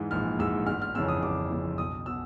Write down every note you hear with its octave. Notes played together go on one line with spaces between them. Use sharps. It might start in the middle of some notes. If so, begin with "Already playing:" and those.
Already playing: G#2 E3 G#3
A#1 F6
G#2 E3 G#3 E6
G1 F6
F6
F2 C#3 E3 E6
D#6
G1 D6
F2 C#3 E3
B1 D#6
B2 E6